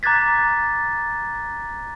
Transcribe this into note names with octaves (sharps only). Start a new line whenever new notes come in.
A#5 D6 F#6 G#6 A6 B6